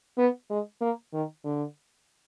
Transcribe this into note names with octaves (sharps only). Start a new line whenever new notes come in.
B3
G#3
A#3
D#3
D3